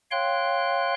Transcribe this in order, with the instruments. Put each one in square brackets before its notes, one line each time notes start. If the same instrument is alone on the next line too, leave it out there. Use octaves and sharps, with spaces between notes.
[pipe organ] C#5 F5 G5 C6 F#6